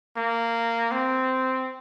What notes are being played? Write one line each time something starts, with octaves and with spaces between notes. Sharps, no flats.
A#3
C4